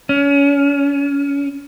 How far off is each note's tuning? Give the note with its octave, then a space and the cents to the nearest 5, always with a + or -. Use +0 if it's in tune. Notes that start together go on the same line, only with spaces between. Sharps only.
C#4 +30